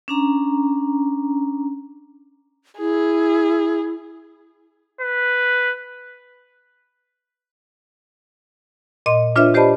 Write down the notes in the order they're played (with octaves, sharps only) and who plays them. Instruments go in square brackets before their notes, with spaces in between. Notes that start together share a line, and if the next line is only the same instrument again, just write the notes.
[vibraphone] C#4 D4 A#5
[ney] E4 [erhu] G#4
[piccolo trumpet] B4
[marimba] A#2 D#5 C6
D4 F4 B4 C#5 E5
G4 C5 D5 D#5 A5 B5